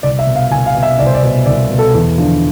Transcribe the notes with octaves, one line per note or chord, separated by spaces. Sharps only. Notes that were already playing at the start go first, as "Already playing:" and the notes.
C2 D5
E5
B2
F5
C2 G#5
F5
B2
E5
C2 D5
C5
D5
B2
C2 D5
B2
A4
E2
D3 F3